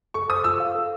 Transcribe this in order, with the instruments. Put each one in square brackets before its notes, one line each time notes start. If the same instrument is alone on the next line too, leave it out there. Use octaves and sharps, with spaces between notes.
[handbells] A4 [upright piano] C#6
[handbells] C5 [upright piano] D#6
[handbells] F4 [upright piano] E6
[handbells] F5
A4